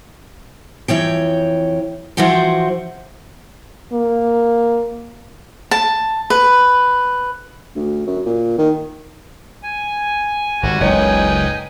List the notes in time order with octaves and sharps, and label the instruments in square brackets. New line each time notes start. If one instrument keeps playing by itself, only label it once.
[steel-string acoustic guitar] F2 E3 C#5 G5
E3 F3 F#4 C5 G5
[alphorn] A#3
[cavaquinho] A5
B4
[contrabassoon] D2
F#2
A#2
D#3
[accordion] G#5
[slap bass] G#1 [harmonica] G3 F#4
[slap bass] F#1 C#2 [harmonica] D#4 B4 G5 [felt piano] C#5